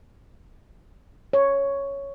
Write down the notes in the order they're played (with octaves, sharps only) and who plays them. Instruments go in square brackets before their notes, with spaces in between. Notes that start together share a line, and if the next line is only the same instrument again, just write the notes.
[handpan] C#5